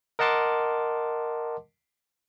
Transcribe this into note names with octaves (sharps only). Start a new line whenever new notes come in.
A#4 D#5 F#5 A5 C6 D6